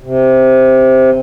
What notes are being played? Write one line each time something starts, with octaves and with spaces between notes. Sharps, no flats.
C3